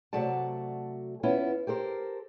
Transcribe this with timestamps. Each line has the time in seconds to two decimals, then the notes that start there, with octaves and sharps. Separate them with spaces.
0.13 C3 F#3 A3 F#4 D5 A5
1.23 B3 C#4 E4 F4
1.67 G4 A4 A#4 C5